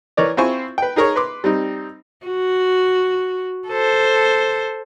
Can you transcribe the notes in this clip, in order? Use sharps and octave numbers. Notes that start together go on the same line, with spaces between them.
E3 A#4 C#5 D5
C4 E4 F4 C5 G#5 C#6
B4 G5
D#4 G#4 A#4 C#5
B4 C6 D6
G3 C4 D#4
F#4
A4 C5